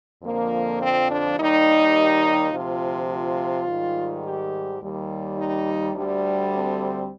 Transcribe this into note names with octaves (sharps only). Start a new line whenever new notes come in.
F2 D3 F3 A#3
C4
D4
D#2 D#3 G3 D#4
D2 C3 F3 F4
F4
G#2 D#3 G3
G4
D#2 D#3 G3
D#4
D2 D3 G3
C4